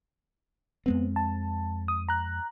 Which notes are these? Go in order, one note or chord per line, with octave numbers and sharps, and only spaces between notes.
F2 G#3 B3 C4
A5
D#6
A#5 F#6